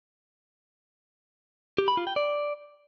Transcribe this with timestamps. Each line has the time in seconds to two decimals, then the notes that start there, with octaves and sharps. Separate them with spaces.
1.78 G4
1.88 B5
1.97 F4
2.07 G5
2.16 D5